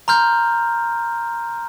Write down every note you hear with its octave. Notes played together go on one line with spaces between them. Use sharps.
A#5 C6 F6 G6